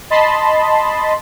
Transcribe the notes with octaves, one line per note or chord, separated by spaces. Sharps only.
D#5 A5 B5 C6